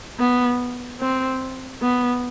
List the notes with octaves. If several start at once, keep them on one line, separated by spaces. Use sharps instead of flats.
B3
C4
B3